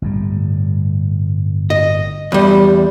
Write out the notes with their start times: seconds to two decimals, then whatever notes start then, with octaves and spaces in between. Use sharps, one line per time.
0.02 G1 A2 G3
1.70 D#5
2.32 E2 G3